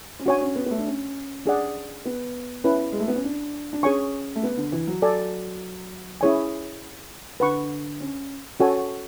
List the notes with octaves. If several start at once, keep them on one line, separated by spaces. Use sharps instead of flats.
C#4
D4 F#4 C#5 G#5
C#4
B3
B3
A3
D4
C#4
D4 G#4 D5 F#5
B3
C#4 E4 B4
G#3
A3
B3
C#4
D4
D4
C#4 G#4 C#5 G#5 C#6
A3
B3
D3
E3
F#3
A4 D5 G#5
C#4 E4 G#4 C#5 G#5
D3 B4 F#5 C#6
C#4
C#4 F#4 A4 C#5 G#5